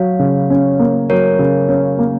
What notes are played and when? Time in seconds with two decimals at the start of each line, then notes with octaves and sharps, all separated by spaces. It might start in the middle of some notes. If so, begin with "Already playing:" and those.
Already playing: F#3 C#5 F5
0.19 C#3
0.50 C#4
0.79 A#3
1.10 F#3 A#4 C#5
1.39 C#3
1.69 C#4
1.99 A#3